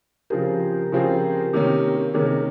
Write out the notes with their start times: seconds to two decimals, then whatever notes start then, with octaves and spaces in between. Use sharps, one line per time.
0.30 C#3 F3 C4 F4 G4 G#4 A#4
0.92 C#3 F3 C4 F4 G#4
1.53 C3 D#3 A#3 C#4
2.14 C3 D#3 A#3 C#4 G#4
2.27 A#4